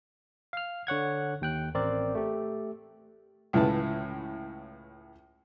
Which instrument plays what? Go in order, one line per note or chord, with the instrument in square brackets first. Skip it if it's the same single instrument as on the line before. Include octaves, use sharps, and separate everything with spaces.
[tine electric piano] F5 F6
D3 C#5 F#5 G#6
D#2 G5 F#6
A1 C4 A#4 D5
A3 G4
[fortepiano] C#2 A2 E3 E4 B4 A5